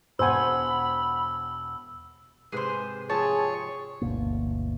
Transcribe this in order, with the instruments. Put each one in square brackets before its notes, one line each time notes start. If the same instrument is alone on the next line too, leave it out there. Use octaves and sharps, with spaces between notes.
[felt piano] E1 F#5 [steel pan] C5 G#5 [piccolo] B5 [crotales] E6
[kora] G#2 C3 B4 [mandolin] G#4 C5
[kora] F3 C4 [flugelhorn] G#4 [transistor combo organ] C#5 [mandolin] A5
[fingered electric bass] G1 D2 B2 A#3